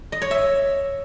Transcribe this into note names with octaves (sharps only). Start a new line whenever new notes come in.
D#5
C#5
E5